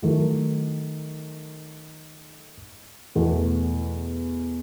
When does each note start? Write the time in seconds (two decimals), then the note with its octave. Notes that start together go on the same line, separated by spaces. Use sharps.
0.02 D#3 F#3 A3
3.15 E2 B2 A3